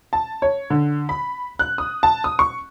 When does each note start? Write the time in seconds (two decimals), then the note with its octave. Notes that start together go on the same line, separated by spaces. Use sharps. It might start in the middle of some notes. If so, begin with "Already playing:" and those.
0.13 A5
0.42 C#5
0.70 D3
1.09 B5
1.59 F#6
1.78 D#6
2.03 A5
2.24 D#6
2.39 C#6